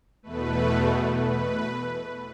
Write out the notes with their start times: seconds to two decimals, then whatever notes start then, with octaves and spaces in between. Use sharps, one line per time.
0.23 E2 B2 A3 B4
1.17 B4